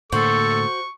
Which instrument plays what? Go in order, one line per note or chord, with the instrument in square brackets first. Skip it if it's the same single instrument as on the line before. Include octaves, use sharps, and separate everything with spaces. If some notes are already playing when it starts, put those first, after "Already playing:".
[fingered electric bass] A2 D3 A#3 [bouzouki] F#4 C5 [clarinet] A4 [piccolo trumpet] C#6